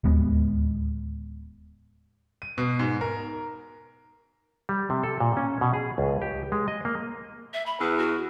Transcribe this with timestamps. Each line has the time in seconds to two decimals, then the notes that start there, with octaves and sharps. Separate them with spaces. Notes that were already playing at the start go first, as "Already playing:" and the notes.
0.04 D1 D#2 G#3 B3
2.42 D#7
2.58 B2
2.79 G#2
3.01 A#4
4.69 G3
4.90 C3
5.03 A4
5.20 A#2
5.37 C#4
5.61 B2
5.74 G#4
5.98 C#2
6.22 G4
6.52 G#3
6.68 D#5
6.85 A#3
7.54 E5
7.66 B5
7.80 E2 B4
7.98 F#4